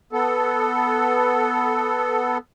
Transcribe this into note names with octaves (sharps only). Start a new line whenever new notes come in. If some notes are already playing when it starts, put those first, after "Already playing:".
B3 A4